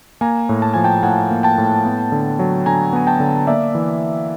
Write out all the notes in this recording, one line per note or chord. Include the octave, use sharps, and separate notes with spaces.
A#3 G#5 A#5
A2
A5
F3 G#5
G5 A5
A2 F#5 G#5
A#3
G5 A5
A2
B3
D3
F#3
D3 G#5 A#5
B3 G#5
G5 A5
D3
A#3 D5 E5
E3